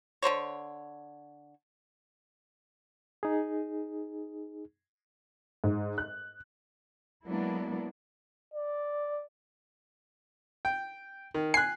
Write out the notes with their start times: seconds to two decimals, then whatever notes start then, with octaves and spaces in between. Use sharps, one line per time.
0.22 D3 A#4 C5 C#5
3.23 D#4 G#4
5.64 G#2
5.98 F#6
7.26 F#3 G#3 A#3 B3 D4 E4
8.54 D5
10.65 G5
11.34 D#3
11.54 G#5 F#6 C7